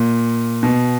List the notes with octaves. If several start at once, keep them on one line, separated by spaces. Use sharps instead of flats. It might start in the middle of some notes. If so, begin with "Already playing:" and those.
Already playing: A#2
B2